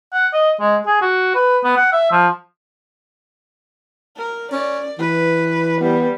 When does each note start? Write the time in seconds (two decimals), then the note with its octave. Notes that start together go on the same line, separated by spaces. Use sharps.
0.13 F#5
0.33 D#5
0.60 G#3
0.86 G#4
1.01 F#4
1.35 B4
1.64 B3
1.76 F#5
1.92 E5
2.11 F3
4.17 A#4
4.52 C#4 D5
4.99 E3 B4
5.81 G3 B3